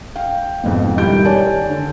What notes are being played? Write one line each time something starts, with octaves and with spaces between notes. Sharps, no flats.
F5 G5
F2 G#2 B2
D#3 G3 E4 G6 D7
G4 C#5 D5 G#5 A5
D3